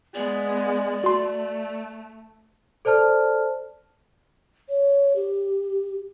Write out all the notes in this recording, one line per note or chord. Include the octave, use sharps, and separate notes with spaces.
G#3 B3 D5
A3 F#4 C6
A4 C5 D5 A5 F6
C#5
G4